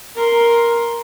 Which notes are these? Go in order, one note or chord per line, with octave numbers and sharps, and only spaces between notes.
A#4 C6